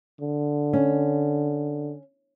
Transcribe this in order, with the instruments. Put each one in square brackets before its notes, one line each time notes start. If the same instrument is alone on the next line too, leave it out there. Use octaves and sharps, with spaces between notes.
[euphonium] D3
[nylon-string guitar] C#4